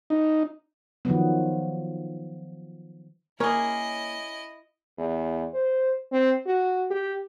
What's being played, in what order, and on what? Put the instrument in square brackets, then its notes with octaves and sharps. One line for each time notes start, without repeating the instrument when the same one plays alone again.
[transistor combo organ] D#4
[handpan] D#3 F3 F#3 B3
[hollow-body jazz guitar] A#3 A#4 C#5 [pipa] C#4 G#4 [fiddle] E4 D#5
[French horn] E2
C5
C4
F#4
G4